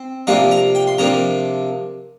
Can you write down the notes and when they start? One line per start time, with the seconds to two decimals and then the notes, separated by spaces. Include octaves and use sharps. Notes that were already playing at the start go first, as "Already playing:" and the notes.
Already playing: C4
0.27 C3 F3 A#3 D4 A#5
0.51 A#5
0.75 G5
0.87 C6
0.98 C3 F3 A#3 D4 A#5